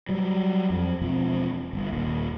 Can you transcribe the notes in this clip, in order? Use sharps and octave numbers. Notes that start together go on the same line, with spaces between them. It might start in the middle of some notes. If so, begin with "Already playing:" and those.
F#3 G3
F2
E1 F3 C4
G1
D#1 D#2